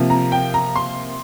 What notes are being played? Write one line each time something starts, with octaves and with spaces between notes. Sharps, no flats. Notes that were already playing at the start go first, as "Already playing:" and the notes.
Already playing: C3 F3 A#3
A#5
G5
A#5
C6